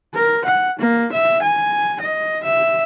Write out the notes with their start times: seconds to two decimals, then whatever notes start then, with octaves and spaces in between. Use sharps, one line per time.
0.14 A#4
0.45 F#5
0.79 A#3
1.12 E5
1.42 G#5
2.01 D#5
2.44 E5